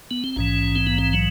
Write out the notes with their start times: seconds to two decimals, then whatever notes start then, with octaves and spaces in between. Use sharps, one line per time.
0.11 B3
0.24 C4
0.36 A#1 G#2 E3 C#4
0.76 C4
0.87 B3
0.99 C4
1.13 F#3